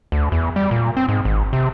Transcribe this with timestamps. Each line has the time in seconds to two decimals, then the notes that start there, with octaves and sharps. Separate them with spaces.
0.12 D2
0.32 E2
0.56 G3
0.71 A#2
0.97 C4
1.09 G#2
1.25 G#1
1.53 C3